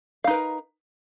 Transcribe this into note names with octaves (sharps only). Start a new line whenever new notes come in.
D#4 A#4 B4 F5